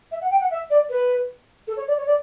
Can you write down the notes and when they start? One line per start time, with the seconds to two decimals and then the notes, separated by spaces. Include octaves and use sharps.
0.12 E5
0.21 F#5
0.31 G5
0.40 F#5
0.51 E5
0.70 D5
0.90 B4
1.67 A4
1.77 C#5
1.88 D5
1.97 C#5
2.06 D5